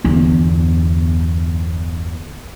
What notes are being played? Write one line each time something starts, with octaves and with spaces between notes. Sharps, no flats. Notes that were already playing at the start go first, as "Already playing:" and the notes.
G1 E2